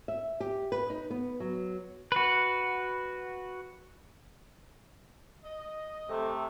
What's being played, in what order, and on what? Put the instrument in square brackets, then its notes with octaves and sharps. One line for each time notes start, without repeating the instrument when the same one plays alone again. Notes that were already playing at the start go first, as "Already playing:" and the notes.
[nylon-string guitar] E5
G4
B4
D#4
B3
F#3
[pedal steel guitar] F#4 B4
[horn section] D#5
[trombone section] C3 [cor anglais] A3 [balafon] A4